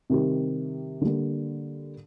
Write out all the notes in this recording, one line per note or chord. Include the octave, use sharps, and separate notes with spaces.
C3 D#3 G3 C4 G4
D3 G3 A#3